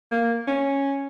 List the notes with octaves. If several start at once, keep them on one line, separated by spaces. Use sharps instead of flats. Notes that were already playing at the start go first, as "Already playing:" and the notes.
A#3
C#4